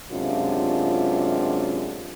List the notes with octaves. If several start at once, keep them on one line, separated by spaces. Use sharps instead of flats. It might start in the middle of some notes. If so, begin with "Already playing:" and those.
F#2 C3 G#3 D4 F4